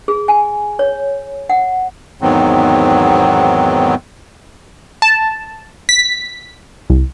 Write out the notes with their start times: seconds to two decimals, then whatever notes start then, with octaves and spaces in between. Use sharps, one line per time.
0.08 G#4
0.28 G#5
0.79 C#5
1.49 F#5
2.22 E2 G#2 D#3 F#3 B3 C4
5.02 A5
5.89 B6
6.90 C2